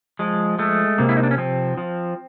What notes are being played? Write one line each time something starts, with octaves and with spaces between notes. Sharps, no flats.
F3 G#3
G#3 A3
C3 A#3
E4
D#4
D4
C#4
F3 C4
F3